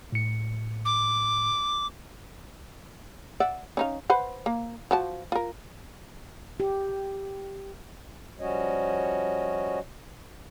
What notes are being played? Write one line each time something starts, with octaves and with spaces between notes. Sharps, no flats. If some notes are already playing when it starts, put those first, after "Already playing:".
A2 C#7
D6
D5 E5 F#5
C#4 D#4 F5
B4 C5 F#5
A#3
F3 F#4 A5
F4 A#4
G4
F3 G3 C#4 F#4 C#5 D#5